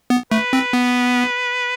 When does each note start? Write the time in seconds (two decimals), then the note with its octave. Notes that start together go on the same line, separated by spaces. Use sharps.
0.10 B3
0.32 A3 B4
0.53 C4
0.73 B3